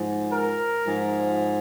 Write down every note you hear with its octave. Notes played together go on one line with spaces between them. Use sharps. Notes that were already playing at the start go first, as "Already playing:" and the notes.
Already playing: G#2 F3
A#4
G#2 F3